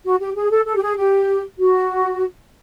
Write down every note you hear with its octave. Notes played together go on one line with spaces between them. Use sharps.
F#4
G4
G#4
A4
A4
G4
G#4
G4
F#4